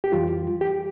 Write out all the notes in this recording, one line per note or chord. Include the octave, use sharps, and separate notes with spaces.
G4
F2 E3 G3 F4
G4